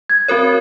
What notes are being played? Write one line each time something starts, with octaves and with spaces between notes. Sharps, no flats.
G#6
C4 F#4 A#4 C#5